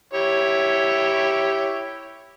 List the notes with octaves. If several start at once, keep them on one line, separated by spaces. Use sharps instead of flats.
E4 G4 C#5